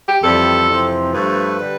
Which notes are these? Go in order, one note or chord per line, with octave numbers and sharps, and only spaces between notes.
G4
F2 E3 G3 A4
F2 C3 E3
G2 F3 A3 B4
D3 G3